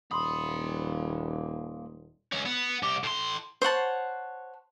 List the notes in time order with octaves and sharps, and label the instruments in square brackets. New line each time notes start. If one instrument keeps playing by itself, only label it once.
[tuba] D#1 [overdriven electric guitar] A#3 B5 [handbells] C6 D#6
[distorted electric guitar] C#2 C#4
B3
C2 G4
A2 C6
[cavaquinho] C5 C#5 F#5 A5